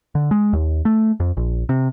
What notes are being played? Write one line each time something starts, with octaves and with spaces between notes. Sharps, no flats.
D3
G#3
D#2
A3
F2
A#1
C3